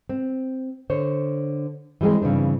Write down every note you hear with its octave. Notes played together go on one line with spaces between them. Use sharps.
C4
D3 C5 C#5
E3 G3 G#3 C4 G#4
G2 C#3 E3 C4 D4